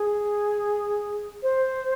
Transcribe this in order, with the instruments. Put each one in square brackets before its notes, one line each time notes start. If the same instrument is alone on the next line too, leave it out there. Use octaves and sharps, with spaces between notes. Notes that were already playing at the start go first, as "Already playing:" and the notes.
Already playing: [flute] G#4
C5